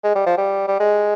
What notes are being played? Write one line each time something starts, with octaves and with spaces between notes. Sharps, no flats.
G#3
G3
F3
G3
G3
G#3